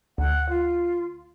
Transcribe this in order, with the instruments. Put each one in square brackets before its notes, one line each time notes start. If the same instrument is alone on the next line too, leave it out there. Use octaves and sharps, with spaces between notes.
[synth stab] D2 [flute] F#5
[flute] F4